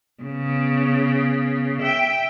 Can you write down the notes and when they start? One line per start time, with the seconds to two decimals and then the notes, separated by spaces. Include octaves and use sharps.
0.23 C#3 B3
1.81 E5 G5